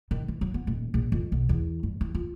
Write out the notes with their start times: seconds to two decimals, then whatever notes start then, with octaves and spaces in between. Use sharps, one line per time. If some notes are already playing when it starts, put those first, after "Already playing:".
0.11 D#3
0.28 E3
0.41 F#3
0.54 B3
0.67 D#1
0.94 A#1
1.12 F2
1.32 B1
1.49 E2
1.83 G2
2.01 E3
2.15 F4